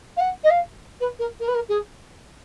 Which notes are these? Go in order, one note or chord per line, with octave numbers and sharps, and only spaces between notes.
F5
F#5
D#5
F5
B4
A#4
A#4
B4
A#4
G#4